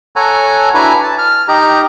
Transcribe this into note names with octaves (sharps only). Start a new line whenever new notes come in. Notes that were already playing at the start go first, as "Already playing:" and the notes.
A4 C#5 F#5 G#5 A#5
D4 E4 F#4 B4 G#5 A#5
A5
F6
D#4 G4 A#5